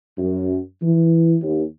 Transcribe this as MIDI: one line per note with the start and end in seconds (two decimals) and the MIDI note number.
0.18 0.58 42
0.82 1.37 52
1.42 1.63 39